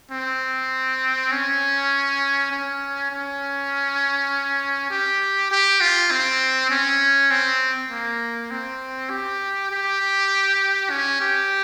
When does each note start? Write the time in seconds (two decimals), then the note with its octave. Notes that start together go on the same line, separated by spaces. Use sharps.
0.12 C4
1.32 C#4
2.51 C#4
3.11 C#4
4.91 G4
5.51 G4
5.81 F4
6.11 C4
6.70 C#4
7.31 C4
7.91 A#3
8.51 C4
9.10 G4
9.71 G4
10.91 C#4
11.21 G4